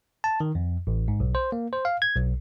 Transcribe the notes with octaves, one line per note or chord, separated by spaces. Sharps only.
A5
D#3
F2
A1
G#2
B1
C5
A#3
C5
F5
G#6
B1